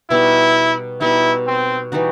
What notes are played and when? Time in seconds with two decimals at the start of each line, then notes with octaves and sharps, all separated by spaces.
0.10 B2 G3 D#4 E4
1.00 B2 G3 D#4 E4
1.47 C4
1.92 E3 G3 D#4 F#4